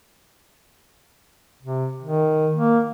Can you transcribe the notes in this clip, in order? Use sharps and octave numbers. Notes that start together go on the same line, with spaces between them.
C3
D#3
A#3